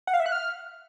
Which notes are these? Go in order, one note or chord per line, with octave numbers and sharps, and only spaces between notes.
F#5
F5
E5
F#6
F6